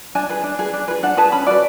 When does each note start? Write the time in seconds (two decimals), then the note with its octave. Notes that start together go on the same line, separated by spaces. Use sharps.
0.15 D4 G#5
0.29 G#4 B4
0.43 D4
0.59 G#4 B4
0.73 D4
0.88 G#4 B4
1.03 D4 F#5
1.17 G#4 B4 A5
1.32 C#4 B5
1.47 F#4 B4 D5